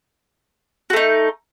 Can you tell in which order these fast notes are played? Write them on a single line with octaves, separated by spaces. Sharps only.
F#4 A3 D#4